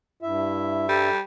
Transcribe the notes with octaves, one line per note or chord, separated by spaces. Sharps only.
G2 E4 E5
G3 A4